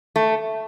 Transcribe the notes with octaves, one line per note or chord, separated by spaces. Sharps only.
A3